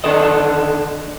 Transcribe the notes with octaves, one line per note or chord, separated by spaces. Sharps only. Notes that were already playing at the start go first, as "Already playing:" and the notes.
D3 D#3 D4 A4 D#5